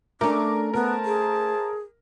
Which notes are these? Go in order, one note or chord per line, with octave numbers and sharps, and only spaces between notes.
A3 C#4 D4 A#4 D6
B3 A#4 C5 E5 A5
G#4